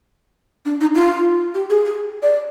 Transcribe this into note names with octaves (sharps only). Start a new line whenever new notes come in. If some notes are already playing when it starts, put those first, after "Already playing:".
D4
D#4
F4
G4
G#4
G#4
D5